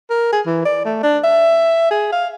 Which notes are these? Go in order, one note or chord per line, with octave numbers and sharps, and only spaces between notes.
A#4
G#4
E3
D5
A3
D4
E5
G#4
F5